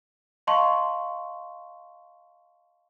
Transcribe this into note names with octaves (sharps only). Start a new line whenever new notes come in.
D#5 F5 A5 C6 C#6